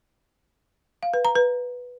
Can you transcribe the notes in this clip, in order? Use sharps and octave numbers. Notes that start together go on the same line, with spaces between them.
F5
B4
A#5
B4